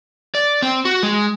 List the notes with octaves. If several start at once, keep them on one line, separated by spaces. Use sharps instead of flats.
D5
C4
F#4
G#3